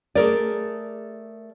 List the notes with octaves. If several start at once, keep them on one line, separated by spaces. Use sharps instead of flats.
A3 G#4 A#4 D5